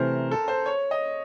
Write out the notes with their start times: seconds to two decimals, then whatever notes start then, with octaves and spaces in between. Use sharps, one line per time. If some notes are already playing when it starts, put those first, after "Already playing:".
Already playing: C3 E3 A3 A#4 C5
0.31 A4
0.48 C5
0.66 C#5
0.91 D#5